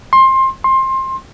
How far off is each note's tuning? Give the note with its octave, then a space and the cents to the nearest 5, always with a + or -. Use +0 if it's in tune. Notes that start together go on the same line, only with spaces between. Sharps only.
C6 +20
C6 +20